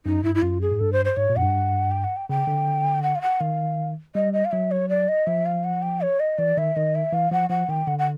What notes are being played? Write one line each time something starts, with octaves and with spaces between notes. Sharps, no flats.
F#2 D#4
G2 E4
E4
F#2 F4
G#4
G#2
G2 A4
C5
C5
G#2 C#5
A#2
F#2 F#5
G2
G5
F#5
G5
C#3 G5
D3
F#5
F5
F#5
D#3 F5
G3 D#5
D#5
F5
F#3 E5
C#5
D5
D#5
F3 E5
F5
F#5
G5
C#5
D#5
E3 D5
D#3 E5
D#3 D#5
E5
E3 F5
F3 F#5
F3 F#5
D#3 G5
D3 F#5
F#5